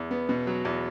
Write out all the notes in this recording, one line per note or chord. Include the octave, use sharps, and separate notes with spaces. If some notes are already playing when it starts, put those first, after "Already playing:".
Already playing: E2
B3
B2
F#3
E2